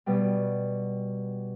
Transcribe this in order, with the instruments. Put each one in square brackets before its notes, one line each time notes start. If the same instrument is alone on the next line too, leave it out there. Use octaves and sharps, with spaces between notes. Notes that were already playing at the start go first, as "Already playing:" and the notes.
[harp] B2 G3